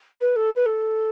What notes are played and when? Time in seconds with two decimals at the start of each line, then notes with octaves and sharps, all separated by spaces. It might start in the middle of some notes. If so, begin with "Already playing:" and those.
0.21 B4
0.36 A4
0.56 B4
0.66 A4